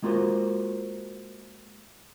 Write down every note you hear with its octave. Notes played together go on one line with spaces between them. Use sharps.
G#3 A#3 F4 F#4 A#4 C5